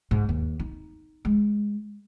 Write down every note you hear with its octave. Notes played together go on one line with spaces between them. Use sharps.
G#2
D#2
D#4
G#3